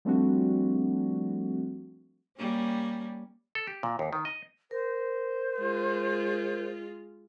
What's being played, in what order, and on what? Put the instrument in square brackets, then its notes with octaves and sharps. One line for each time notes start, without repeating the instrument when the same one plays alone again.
[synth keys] F3 G3 A3 C4 D4 F#4
[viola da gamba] G3 A#3 C#4
[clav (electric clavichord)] A4
G4
A#2
D#2
D#3
D#5
[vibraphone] A#4 [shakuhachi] C5
[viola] G#3 F4